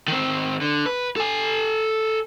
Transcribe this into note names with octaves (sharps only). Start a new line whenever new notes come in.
D#3 C4
D3
B4
A4 G#5